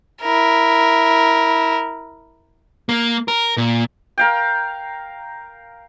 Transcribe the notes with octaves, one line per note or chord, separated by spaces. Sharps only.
E4 A#4
A#3
A#4
A#2
A#4 F5 G5